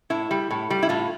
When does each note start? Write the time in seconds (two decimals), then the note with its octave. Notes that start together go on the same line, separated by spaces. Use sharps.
0.10 A2 E4
0.31 G3
0.51 A2
0.70 G3
0.83 E4
0.89 A2 F4